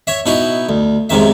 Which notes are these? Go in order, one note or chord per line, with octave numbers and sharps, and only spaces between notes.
C#5 E5
B2 D#4 E4 C#6
D2
B1 G#2 C3 D#3 E5